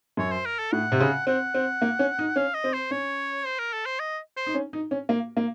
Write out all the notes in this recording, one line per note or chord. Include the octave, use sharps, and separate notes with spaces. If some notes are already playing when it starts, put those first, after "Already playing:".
F#2 C#5
C5
A#4
A4
A2 F#5
C3
C#3
C4 F#5
C4
A#3
C#4
D#4
C#4 F5
D#5
C4
C5
C#4 C#5
C5
A#4
A4
C5
D#5
C5
D#4
C#4
D#4
C#4
A#3
A#3